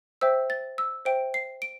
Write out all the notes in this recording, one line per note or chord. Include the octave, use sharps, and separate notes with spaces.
C5 E5 G5 E6
A6
E6
C5 E5 G5 D7
C7
D7